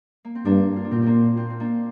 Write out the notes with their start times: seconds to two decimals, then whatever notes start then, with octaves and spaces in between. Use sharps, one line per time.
0.25 A#3
0.35 C4
0.45 G2 A#3 D4
0.76 F4
0.84 D4
0.91 A#2 C4 F4
1.02 A#3 C4 D4
1.37 C4 F4
1.50 C4
1.60 A#3 D4